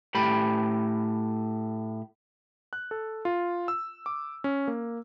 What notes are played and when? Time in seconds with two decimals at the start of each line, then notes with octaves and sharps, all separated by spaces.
0.15 A2 G4 B5
2.73 F#6
2.91 A4
3.25 F4
3.68 E6
4.06 D6
4.44 C#4
4.68 A#3